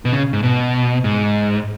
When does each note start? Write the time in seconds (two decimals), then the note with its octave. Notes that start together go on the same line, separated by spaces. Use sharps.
0.05 B2
0.13 C#3
0.33 G#2
0.43 B2
1.04 G#2